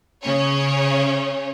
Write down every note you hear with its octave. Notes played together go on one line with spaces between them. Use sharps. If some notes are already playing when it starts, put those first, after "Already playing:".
C#3 C#4 C#5